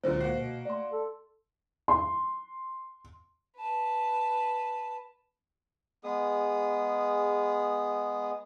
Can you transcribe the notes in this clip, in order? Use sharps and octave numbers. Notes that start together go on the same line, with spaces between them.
C#2 A#2 D3 F#3 C5
A#3 F#4 C7
B2
A3 D5 C6
A4
C6
B4 A5
G#3 B3 G#4 D#6